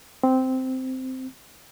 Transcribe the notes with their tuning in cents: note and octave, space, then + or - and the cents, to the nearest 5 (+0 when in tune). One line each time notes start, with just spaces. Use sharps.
C4 -10